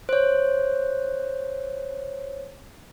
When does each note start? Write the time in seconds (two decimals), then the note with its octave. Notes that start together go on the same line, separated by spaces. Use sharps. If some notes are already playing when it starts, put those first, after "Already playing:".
0.09 C5 C#5